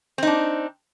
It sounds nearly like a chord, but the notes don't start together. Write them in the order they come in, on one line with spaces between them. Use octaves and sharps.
C4 D#4 D4